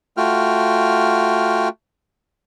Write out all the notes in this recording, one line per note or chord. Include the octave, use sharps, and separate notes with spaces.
A3 F4 F#4 G5 F6